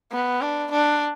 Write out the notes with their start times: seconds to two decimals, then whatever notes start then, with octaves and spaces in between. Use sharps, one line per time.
0.12 B3
0.42 D4
0.71 D4